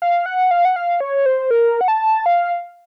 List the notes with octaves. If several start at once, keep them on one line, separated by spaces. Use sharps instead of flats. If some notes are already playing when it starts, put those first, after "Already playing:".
F5
F#5
F5
F#5
F5
C#5
C5
A#4
F#5
A5
F5